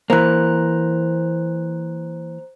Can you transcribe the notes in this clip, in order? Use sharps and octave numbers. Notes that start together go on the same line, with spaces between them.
E3 A#3 C5 A#5 F#6